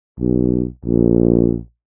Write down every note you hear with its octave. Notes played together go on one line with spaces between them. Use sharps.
B1
A#1